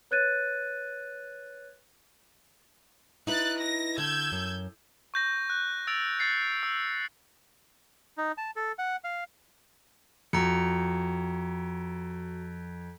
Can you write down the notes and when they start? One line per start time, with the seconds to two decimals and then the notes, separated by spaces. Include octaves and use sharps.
0.11 B4 C#5 F#6 G#6 A6 D#7
3.27 D#4 E4 B4 F#6 A6
3.57 A#6
3.98 D3 E6 G6 G#6
4.32 F#2
5.14 C#6 G6 A#6
5.50 F#6
5.87 E6 A6 D7 F7
6.19 F#6 A6 C7 C#7
6.63 E6
8.18 D#4
8.38 A5
8.56 A4
8.79 F#5
9.04 F5
10.33 F2 F#4 A#5 C#7